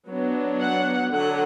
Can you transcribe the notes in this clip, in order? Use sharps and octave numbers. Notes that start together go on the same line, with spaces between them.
F#3 B3 D4
F#5
D3 F#3 F#5